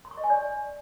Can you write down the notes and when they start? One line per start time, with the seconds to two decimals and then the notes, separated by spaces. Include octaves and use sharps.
0.05 C6
0.11 C#6
0.17 D#5
0.24 G#5
0.30 D5